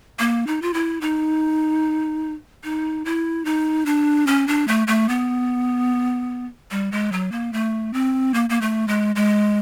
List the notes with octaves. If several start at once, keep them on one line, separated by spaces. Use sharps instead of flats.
A#3
D#4
F4
E4
D#4
D#4
E4
D#4
D4
C#4
D4
A3
A3
B3
G3
G#3
F#3
A#3
A3
C4
A#3
A#3
A3
G#3
G#3